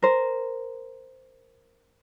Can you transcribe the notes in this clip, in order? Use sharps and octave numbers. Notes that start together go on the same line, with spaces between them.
A#4 C5